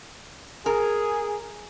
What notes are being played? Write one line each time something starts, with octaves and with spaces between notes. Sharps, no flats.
G#4 A#4